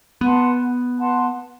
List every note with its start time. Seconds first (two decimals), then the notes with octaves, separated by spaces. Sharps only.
0.21 B3 B4 F#5 A5 C6
0.98 B4 F#5 A5 C6